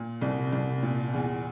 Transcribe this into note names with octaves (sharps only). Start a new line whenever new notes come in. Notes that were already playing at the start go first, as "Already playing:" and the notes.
Already playing: A#2
C2
C2
A#2
E2